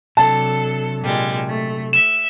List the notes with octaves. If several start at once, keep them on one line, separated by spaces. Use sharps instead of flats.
C3 F#3 D4 A4 A5
A#2 G3 G#3
A3
E5 E7